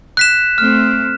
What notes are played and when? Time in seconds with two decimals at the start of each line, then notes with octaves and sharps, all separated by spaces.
0.17 F#6 B6 E7
0.58 A3 C4 F6